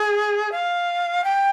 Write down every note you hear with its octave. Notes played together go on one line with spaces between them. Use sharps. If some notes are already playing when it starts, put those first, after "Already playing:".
Already playing: G#4
F5
G5